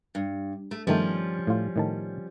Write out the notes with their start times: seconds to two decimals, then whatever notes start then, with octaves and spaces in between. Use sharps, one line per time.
0.15 G2
0.71 A3
0.87 G2 D#3 F3 G3 A3 C#4
1.47 A2 F4
1.76 A2 D#3 A5